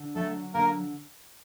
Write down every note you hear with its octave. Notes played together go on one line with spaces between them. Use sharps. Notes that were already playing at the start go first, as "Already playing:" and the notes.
Already playing: D3
F#3 A3 A4
D3 A#3 A#4